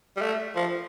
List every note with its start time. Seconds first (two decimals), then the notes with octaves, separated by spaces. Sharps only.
0.17 G3
0.22 A3
0.56 F3